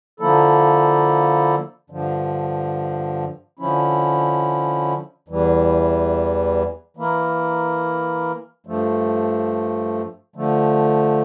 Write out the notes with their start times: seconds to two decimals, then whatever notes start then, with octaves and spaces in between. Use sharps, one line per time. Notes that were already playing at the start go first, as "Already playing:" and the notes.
0.20 D3 F3 A#3 E4 A4
1.90 G2 D3 F3
3.59 D3 F3 C#4 E4
5.28 E2 E3 G3
6.97 E3 A#3 E4 A#4
8.66 G2 F3 A3
10.36 D3 F3 A3